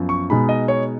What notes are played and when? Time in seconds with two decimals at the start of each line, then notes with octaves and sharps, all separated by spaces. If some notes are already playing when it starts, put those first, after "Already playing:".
Already playing: F#2 F3 B3
0.09 C#6
0.30 B2 G#3 D#4 B5
0.49 D#5
0.68 C#5